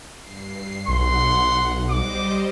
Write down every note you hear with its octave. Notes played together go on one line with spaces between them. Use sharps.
G2 C7
B1 F#5 C6
G3 C5 D#5 D6